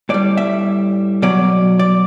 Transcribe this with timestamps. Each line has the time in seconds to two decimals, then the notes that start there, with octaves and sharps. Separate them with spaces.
0.09 A2 G3 D5
0.37 E5
1.22 B2 F#3 D5
1.79 D5